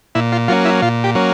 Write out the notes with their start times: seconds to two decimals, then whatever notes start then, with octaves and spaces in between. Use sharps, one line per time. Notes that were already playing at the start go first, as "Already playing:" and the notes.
0.15 A#2 E4
0.32 F4
0.48 F#3 A#3 C#4 F4
0.65 E4
0.82 A#2 F4
1.04 G4
1.15 F#3 A#3 C#4